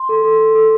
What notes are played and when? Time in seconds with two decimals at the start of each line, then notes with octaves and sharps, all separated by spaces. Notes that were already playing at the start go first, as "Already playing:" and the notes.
Already playing: C6
0.09 A4
0.24 A4
0.39 A4
0.55 A4